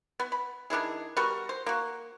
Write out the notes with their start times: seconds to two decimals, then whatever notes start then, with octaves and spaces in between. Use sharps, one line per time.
0.20 B3
0.32 B5
0.70 D#3 D4 E4 G#4
1.17 G3 B3 F#4 A#4
1.49 C5
1.66 A#3 F#4